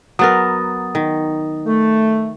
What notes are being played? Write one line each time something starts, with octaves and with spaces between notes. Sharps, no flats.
F#3 B3 A#4 D#6 A6
D#3
A3